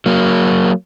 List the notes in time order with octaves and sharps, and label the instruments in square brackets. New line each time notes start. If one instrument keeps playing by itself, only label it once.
[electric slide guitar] F#3 A#3